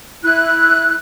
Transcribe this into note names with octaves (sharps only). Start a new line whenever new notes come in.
E4 F#6